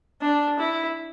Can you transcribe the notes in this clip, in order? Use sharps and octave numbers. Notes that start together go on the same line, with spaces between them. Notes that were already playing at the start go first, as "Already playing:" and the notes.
D4
E4